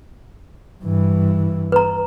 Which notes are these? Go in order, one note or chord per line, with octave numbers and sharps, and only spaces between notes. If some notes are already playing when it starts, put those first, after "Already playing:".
G2 E3
B4 A#5